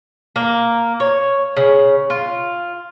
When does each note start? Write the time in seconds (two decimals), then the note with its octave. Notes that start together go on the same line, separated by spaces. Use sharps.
0.36 A#3
1.00 C#5
1.57 C#3
2.10 F4